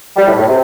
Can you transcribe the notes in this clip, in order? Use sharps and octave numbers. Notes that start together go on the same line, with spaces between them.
G3
A2
A2
C3